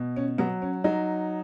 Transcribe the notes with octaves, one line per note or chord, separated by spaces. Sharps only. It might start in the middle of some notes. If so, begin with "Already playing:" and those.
Already playing: B2
C#4
F#3 B3
C#4
F#3 D#4